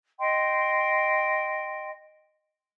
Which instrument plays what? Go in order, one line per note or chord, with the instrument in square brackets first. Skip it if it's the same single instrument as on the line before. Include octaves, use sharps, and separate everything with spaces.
[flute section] D#5 G5 C6